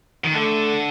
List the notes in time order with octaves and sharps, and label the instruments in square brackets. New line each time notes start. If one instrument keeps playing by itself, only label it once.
[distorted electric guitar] D#3
[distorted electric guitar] D3 [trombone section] A3